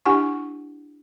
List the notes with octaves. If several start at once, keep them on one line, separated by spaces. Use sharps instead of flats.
D4 E4 G4 F#5 G#5 C#6